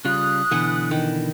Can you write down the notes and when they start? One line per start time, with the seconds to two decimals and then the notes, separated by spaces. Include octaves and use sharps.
0.05 C#3 G3 F4 D#6 F#6
0.51 B2 D3 E3 B4 F#5 G#5
0.91 D#3